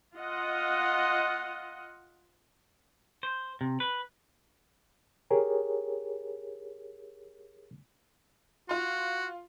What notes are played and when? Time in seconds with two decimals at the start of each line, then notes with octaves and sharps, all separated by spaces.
0.16 F4 D#5 F#5
3.23 C5
3.61 C3
3.80 B4
5.30 G4 G#4 A#4 C#5
8.69 F4 F#4 C6